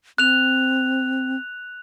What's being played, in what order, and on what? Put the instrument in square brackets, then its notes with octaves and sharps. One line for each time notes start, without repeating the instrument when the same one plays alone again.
[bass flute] C4 [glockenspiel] F#6 F7